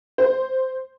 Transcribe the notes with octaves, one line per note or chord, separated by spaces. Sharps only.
C5